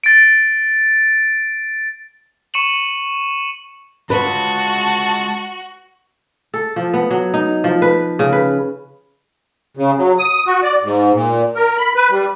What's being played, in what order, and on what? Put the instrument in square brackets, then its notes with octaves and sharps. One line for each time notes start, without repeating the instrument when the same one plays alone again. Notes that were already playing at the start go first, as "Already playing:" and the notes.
[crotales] A6 D7
C#6 C#7 D#7 E7 F#7
[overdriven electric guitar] G#3 F4 [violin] F#4 [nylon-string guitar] B4 [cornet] A5
[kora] A4
F3
B3
F#3
D#4
F3
B4
C#3
B4
[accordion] C#3
F#3
D#6
F#4
D5
G#2
A#2
A#4
B5
B4
G3